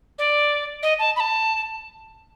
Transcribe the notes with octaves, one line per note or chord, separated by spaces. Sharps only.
D5
D#5
A5
B5
A5